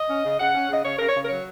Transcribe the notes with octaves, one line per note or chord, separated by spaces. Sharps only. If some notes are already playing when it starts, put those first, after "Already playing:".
Already playing: D#5
C#4
C#3
C#3 F#5
C#4
C#3 D#5
C#3 C#5
C#3 A#4
C#5
C#3
A#4
F#3 C#5